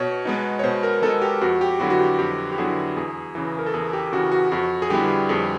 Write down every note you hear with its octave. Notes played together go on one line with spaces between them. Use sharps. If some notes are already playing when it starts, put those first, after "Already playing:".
Already playing: B2 C#5
G#3 B3 D#4
C#5
B2 C5
A#4
G#3 B3 D#4 A4
G4
F2 F#4
G4
D3 F#3 B3 E4 F#4
F#4
G4
F2 G4
G4
D3 F#3 B3 E4 G#4
E2 G#4
C#3 E3
A#4
A4
E2 G#4
G4
C#3 E3 F#4
F#4
F2 F#4
G#4
D3 G3 B3 E4 G4
F2 G#4